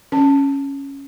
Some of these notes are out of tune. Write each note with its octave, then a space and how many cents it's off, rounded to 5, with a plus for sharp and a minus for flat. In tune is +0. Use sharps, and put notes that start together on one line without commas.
C#4 +0 A5 +15